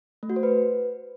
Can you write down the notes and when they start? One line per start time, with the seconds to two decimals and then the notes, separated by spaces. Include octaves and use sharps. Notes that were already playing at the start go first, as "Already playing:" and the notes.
0.23 A3
0.30 F#4
0.36 C5
0.43 B4